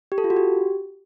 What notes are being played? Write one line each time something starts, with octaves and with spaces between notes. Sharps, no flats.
G4
A4
F4
F#4
G4